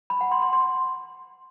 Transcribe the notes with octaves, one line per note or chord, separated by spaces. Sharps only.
B5
F#5
C6
C6
C6